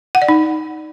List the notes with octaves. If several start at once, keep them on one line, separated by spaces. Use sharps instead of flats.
F#5
D5
D#4